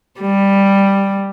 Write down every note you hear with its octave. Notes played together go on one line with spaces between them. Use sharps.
G3